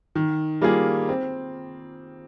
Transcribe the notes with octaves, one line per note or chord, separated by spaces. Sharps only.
D#3
G3 A#3 F4 G#4
C4